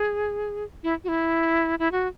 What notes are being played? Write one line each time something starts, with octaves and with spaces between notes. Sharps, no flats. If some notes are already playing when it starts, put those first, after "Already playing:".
Already playing: G#4
E4
F#4
E4
E4
F#4